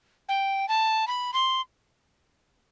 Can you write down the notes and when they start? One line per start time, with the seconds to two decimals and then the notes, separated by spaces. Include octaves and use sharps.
0.29 G5
0.68 A5
1.07 B5
1.34 C6